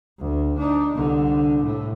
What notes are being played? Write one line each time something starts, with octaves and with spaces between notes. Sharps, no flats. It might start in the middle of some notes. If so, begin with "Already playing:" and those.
D2
D4 D#4
C2 D3
A2